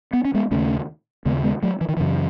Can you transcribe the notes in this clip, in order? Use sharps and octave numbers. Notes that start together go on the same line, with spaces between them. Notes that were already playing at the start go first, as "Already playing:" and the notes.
B3
C#4
G#3 B3
D#2 C#3 A3 C#4
D#2 C#3 G#3 B3
G#3 B3
F#3 A3
E3
D#3
F#2 C#3 E3